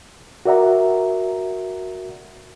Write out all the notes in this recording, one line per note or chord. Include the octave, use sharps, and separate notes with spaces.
F#4 A#4 D5 E5 F#5 A#5